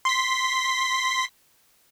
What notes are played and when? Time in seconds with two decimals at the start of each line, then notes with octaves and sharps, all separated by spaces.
0.05 C6 B6